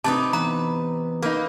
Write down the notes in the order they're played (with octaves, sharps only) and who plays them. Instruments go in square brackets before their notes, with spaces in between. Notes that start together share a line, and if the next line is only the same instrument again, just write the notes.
[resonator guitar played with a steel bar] C3 [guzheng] D#4 B4 D5 [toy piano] A5
[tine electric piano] E3 B3 [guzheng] B4 [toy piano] A#5
[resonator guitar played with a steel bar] A#3 D#4 [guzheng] B4